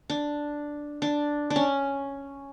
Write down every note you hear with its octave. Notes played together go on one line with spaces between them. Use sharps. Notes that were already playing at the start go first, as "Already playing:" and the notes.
D4
D4
D4
C#4